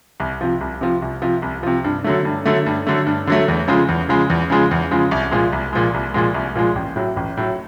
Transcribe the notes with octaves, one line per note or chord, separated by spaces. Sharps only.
C2
C3 F3
C2
C3 F3
C2
C3 F3
C2
C3 F3
G2
D3 F#3 A3
G2
D3 F#3 A3
G2
D3 F#3 A3
G2
D3 F#3 A3
E2
C#3 F3 G#3
E2
C#3 F3 G#3
E2
C#3 F3 G#3
E2
C#3 F3 G#3
C2
A#2 F3 G#3
C2
A#2 F3 G#3
C2
A#2 F3 G#3
C2
A#2 F3 G#3
A1
A2 F#3
A1
A2 F#3